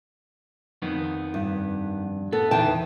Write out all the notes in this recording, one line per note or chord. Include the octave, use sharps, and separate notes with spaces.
F2 D#3 B3
G2
B3 A4
E2 D#3 E3 G5 A5